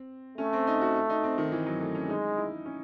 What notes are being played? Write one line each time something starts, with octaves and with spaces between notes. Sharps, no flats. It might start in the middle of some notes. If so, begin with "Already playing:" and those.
Already playing: C4
A3 C#4
C4
D#4
F#4
D#4
C4
D#3
E3
F#3
A3
C#4
G#3 D#4
E4
C#4